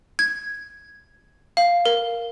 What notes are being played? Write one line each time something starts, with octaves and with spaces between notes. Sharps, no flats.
G#6
F5
A#4